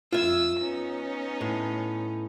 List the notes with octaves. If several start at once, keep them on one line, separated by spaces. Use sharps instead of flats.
F2 F4 E5 D#6 E6
B3 C#4 D#4
A2